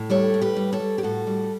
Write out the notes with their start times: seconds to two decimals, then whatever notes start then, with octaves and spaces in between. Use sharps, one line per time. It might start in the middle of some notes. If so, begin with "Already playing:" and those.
Already playing: A2
0.10 G3 A4 C#5
0.34 A2
0.41 G4 B4
0.57 G3
0.73 A4 C#5
0.80 G3
0.98 G4
1.03 A2 F#4 A4
1.27 G3